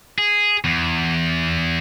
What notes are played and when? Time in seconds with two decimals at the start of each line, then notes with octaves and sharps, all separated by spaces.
0.18 G#4
0.64 E2